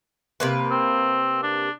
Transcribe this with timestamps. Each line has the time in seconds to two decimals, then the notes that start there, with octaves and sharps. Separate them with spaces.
0.40 C3 A#3 B4
0.71 C4
1.43 D4